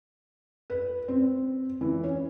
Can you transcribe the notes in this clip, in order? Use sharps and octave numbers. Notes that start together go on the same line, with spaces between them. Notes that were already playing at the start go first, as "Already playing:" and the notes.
B4
C4
E3
C#4